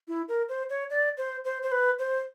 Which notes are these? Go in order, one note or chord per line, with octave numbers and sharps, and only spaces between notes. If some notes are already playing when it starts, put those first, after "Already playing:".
E4
A#4
C5
C#5
D5
C5
C5
C5
B4
C5